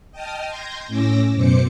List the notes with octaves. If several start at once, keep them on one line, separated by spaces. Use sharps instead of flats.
D#5 G5 A5 D#6 F6
C6 G6 G#6 A#6
A2 C#4 D6 E6 A#6
F#2 B2 C5 D6 C#7